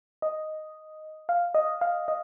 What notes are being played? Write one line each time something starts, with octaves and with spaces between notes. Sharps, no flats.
D#5
F5
D#5
F5
D#5